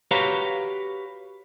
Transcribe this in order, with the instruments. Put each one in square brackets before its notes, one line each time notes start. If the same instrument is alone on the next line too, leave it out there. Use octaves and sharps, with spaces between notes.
[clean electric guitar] F#4 G4 B4 C#5 F5 A#5